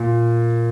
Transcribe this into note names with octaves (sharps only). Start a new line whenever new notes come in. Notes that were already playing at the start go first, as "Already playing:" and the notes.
Already playing: A#2